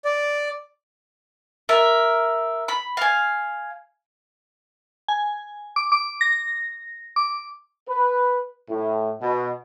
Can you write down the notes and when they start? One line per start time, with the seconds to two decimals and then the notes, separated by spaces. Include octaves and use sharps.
0.05 D5
1.69 A#4 E5
2.68 B5
2.97 F5 G#5
5.08 G#5
5.76 D6
5.92 D6
6.21 A#6
7.16 D6
7.89 B4
8.70 A2
9.22 B2